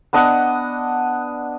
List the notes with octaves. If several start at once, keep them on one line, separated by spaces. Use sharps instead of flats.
B3 D4 D#5 F#5